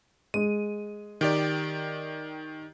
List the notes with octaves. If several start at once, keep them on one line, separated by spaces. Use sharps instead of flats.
G#3 D#7
D#3 G4 D5